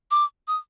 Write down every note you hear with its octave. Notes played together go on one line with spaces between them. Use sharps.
D6
D#6